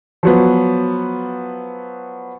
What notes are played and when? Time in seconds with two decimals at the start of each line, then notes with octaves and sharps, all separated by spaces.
0.23 F3 F#3 B3